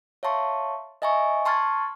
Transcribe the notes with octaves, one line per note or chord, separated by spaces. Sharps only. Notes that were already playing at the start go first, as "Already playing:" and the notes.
C#5 E5 F5 A5 C6 C#6
D#5 E5 G#5 A#5 C#6
A5 C6 C#6 F6 G#6 A6